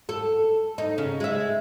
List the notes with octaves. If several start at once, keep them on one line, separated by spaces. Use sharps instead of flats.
A4
D#4
C#3
G#3 E5